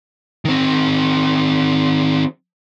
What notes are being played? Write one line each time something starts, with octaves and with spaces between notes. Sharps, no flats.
D#3 C4